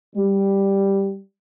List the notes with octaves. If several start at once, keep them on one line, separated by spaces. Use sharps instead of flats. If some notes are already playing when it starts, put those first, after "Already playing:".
G3